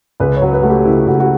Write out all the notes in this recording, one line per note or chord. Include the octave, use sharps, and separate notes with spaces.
C#2 B4
C#5
F#3
B4
A3 F#4
G4
C#3 E4
C#2 F#4
F#4